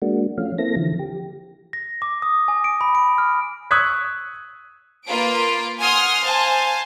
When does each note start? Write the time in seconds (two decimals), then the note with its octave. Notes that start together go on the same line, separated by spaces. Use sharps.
0.02 G#3 A#3 D4 F#4
0.38 F3 A3 C#4 F5
0.58 A#3 C4 E4 A4 A#6
0.76 D3 E3 F3
1.00 G4
1.73 A#6
2.02 D6
2.22 D#6
2.48 G#5
2.64 D7
2.81 B5
2.95 D7
3.18 F6
3.71 C#6 D#6 E6 F#6 G#6 B6
5.05 A#3 F4 B4 D7
5.80 F#5 G#5 C6 D#6 F6
6.24 C5 F5 G#5 A5